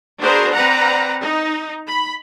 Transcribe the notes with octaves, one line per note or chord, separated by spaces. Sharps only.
B3 D4 F#4 G#4 A#4 C5
C4 B4 D5 F#5 A#5
D#4
B5